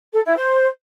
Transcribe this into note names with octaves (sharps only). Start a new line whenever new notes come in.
A4
E4
C5